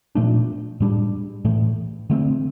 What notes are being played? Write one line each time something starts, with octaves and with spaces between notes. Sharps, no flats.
A#2 F3 A3 D4
A2 G3 D4
A2 E3 A3
D3 A3 C4